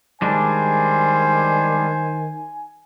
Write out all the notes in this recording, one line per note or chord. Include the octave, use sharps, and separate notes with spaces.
D#3 G3 G#3 D4 C5 G#5